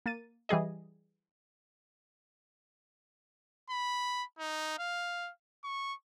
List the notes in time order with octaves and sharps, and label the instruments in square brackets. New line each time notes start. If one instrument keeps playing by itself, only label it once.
[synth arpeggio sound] A#3 A6 D#7
E3 G3 G#4 D#5
[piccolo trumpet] B5
D#4
F5
C#6